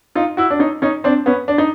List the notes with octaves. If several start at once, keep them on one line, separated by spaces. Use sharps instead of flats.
D#4 F4
E4 F#4
D4
C#4 D#4
C#4 D#4
C4 D4
B3 C#4
D4
D#4